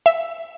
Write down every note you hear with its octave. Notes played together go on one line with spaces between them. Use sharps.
E5